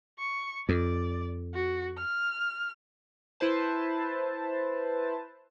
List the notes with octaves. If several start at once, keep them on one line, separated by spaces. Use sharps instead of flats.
C#6
F2 D5
F#4
F6
E4 B4 C5 A5